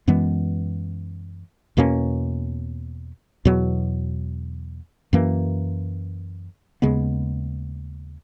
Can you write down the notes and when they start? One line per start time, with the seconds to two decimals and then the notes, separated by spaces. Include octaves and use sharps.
0.08 F#2 E3 G#3 B3
1.77 E2 B2 A#3 C#4
3.45 E2 B2 F#3
5.13 F#2 E3 A#3
6.82 D#2 C#3 G#3 B3